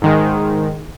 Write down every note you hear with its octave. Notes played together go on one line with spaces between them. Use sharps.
G#2 D#3 G#3